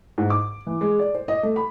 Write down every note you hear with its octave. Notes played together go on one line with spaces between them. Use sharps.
G#2
D6
E3
G#3
D5
C5
D#5
A3
B5